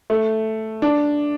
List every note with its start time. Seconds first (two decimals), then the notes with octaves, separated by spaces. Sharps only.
0.10 A3
0.82 D4